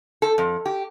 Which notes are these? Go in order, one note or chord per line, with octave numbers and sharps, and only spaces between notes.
A4
F2
G4